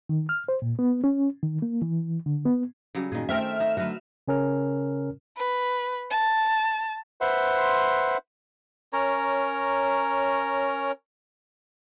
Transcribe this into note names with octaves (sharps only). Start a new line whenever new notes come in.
D#3
F6
C5
A#2
B3
C#4
D#3
A#3
E3
D3
B3
C#3 F#3 G3
A#2 D#3 D#4 G#4
A3 C4 D#4 A4 A#4 E5 G5 F6
D#4
D3 F#3 A3 F#4 B4
C#3 C#4 A#4 F6
B4
A5
B4 C5 E5 F#5 C6
C#4 A#4 C#5 A#5